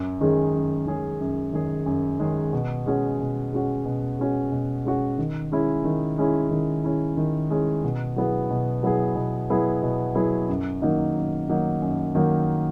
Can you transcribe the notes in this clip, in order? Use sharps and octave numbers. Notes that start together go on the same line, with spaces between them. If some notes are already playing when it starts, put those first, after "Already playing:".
Already playing: F#2
D#3 G#3 C#4 G#4
F#2
D#3 G#3 C#4 G#4
F#2
D#3 G#3 C#4 G#4
F#2
D#3 G#3 C#4 G#4
B2
G#3 C#4 F#4
B2
G#3 C#4 F#4
B2
G#3 C#4 F#4
B2
G#3 C#4 F#4
D#3
G#3 C#4 E4
D#3
G#3 C#4 E4
D#3
G#3 C#4 E4
D#3
G#3 C#4 E4
B2
F#3 B3 E4 G#4
B2
F#3 B3 E4 G#4
B2
F#3 B3 E4 G#4
B2
F#3 B3 E4 G#4
F#2
D#3 F#3 A#3 D#4
F#2
D#3 F#3 A#3 D#4
F#2
D#3 F#3 A#3 D#4